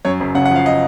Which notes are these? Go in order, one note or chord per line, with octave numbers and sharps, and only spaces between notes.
F#2 C#5
F#1
C#3 F#5
F#5
F3 F5
D#5